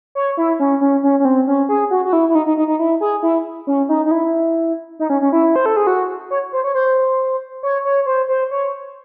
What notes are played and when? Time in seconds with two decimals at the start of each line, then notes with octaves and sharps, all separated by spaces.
0.15 C#5
0.37 E4
0.60 C#4
0.81 C#4
1.04 C#4
1.20 C#4
1.25 C4
1.47 C#4
1.69 G#4
1.91 F#4
2.05 F#4
2.13 E4
2.29 E4
2.35 D#4
2.46 D#4
2.57 D#4
2.68 D#4
2.79 E4
3.01 G#4
3.23 E4
3.67 C#4
3.89 D#4
4.05 D#4
4.11 E4
4.99 D#4
5.10 C#4
5.21 C#4
5.32 E4
5.56 C5
5.66 A4
5.77 G#4
5.87 F#4
6.31 C#5
6.53 C5
6.64 C#5
6.75 C5
7.63 C#5
7.85 C#5
8.06 C5
8.28 C5
8.51 C#5